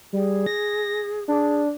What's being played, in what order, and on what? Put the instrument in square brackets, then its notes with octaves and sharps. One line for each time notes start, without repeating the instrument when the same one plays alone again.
[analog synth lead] G3 [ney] G#4
[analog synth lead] A#6
[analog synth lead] D4 [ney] G#4